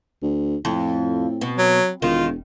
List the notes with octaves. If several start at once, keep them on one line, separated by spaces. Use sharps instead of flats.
D2
F2 A2
B2
F#3
E1 D#3 F4